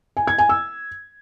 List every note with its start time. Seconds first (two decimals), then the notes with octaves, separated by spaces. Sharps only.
0.17 G#5
0.28 G#6
0.38 G#5
0.49 E6